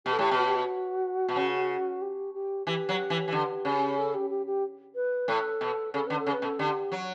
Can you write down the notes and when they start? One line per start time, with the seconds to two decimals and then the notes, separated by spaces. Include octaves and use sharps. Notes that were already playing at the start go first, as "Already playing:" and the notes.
0.05 B2 G4
0.13 A4
0.19 A2 G4
0.31 B2
0.38 F#4
0.47 G4
0.56 F#4
1.29 B2
1.36 C#3
2.02 G4
2.34 G4
2.67 E3 G4
2.89 F#3
3.10 E3
3.28 E3
3.32 D3
3.65 C#3
3.98 A4
4.14 G4
4.30 G4
4.47 G4
4.95 B4
5.28 A2 A4
5.61 B2
5.94 C#3 A4
6.07 D3 B4
6.20 A4
6.27 C#3
6.32 B4
6.42 B2
6.45 A4
6.59 D3 G4
6.92 F#3